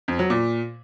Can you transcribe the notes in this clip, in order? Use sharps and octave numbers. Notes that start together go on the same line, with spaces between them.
F2
F#3
A#2